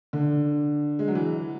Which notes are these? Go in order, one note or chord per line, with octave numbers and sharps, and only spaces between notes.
D3
G#3
F#3
E3